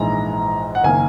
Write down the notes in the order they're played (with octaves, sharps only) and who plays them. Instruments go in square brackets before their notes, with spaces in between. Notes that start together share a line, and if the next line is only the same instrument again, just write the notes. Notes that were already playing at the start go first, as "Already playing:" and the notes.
Already playing: [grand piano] A#1 G#2 E3 G#3 A#5
F#5
F#1 D#3 A#3 G#5